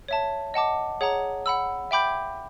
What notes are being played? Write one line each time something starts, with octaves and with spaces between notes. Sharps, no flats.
C#5 E5 A5
D#5 F#5 A5 D6
G#4 C#5 F#5 A#5
F#5 B5 E6
E5 G5 B5 D6 G6